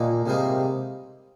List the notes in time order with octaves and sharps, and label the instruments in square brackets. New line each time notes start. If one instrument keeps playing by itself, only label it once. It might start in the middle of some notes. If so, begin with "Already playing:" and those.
Already playing: [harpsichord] D#2 A#3 D#4 [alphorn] A#2
[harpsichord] G#2 D#3 G3 A#3 D#4 [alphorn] C3